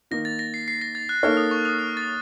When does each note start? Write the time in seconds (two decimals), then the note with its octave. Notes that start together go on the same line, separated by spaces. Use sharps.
0.11 D#3 A#3 D#4 A#6
0.25 A6
0.39 A#6
0.54 C7
0.68 C7
0.81 A#6
0.95 A6
1.09 F#6
1.23 A#3 D#4 A4 C#5 F6
1.37 D#6
1.51 C#6
1.65 D#6
1.79 F6
1.97 A6